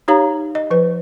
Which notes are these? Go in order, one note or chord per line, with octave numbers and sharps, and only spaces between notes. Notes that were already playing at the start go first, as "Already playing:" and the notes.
D#4 G4 C#5 F5 A#5
D#5
F3 B4